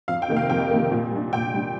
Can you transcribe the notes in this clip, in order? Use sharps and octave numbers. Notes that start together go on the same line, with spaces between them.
F2 F5
G5
C3 D#3 A#3
F5
F2 G5
C3 D#3 A#3
A#2
G3 D4
A#2 G5
G3 D4